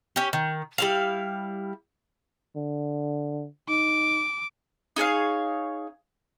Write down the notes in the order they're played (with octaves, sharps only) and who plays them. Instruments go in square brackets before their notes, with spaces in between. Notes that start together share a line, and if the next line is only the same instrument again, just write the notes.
[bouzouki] C#4 G4
D#3
G3 E4 F5
[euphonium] D3
[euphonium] D#4 [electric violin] D6
[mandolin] D#4 G#4 C#5 F5